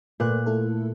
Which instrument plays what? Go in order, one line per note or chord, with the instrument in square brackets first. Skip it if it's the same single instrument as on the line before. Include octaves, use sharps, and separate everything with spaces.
[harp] A#2 F#6 [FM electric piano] A3 F4 B4
[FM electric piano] A3 E4 A4